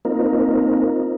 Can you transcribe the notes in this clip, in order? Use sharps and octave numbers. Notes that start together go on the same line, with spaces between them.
A#3 C4 D#4 F4 A#4